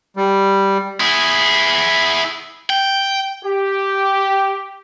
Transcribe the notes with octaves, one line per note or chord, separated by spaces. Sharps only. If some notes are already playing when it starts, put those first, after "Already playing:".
G3
E4 G#4
G5
G4